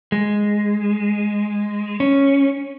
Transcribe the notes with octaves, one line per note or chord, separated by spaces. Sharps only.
G#3
C#4